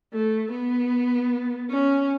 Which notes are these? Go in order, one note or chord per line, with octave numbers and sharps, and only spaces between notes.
A3
B3
C#4